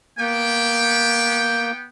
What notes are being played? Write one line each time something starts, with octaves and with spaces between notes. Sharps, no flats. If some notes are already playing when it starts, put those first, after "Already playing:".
A#3 B3 G5